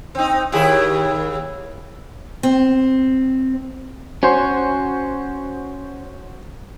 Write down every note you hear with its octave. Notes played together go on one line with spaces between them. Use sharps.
C4 D#4
D#2 E4 G#4
C4
C#4 F#4 C5 C6